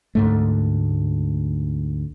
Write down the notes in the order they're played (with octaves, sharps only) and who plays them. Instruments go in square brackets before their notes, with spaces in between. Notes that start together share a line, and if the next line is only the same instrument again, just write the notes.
[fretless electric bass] D2 G#2 A3